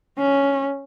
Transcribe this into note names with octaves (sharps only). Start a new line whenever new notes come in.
C#4